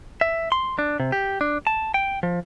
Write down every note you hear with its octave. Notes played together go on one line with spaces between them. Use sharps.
E5
C6
D4
C3
G4
D4
A5
G5
F3